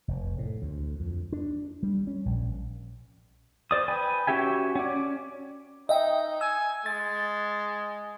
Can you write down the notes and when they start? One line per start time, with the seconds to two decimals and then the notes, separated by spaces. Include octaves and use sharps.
0.08 F1
0.38 A2
0.62 D2
1.00 F2
1.32 D4
1.83 G3
2.07 C#4
2.26 A#1
3.71 C5 D5 D#6
3.88 B4 G5 G#5
4.27 C#4 F#4 G4 E5 G#5
4.75 C#4 D5
5.89 D#4 D#5 E5 G5
6.41 G#5 E6
6.86 G#3 A6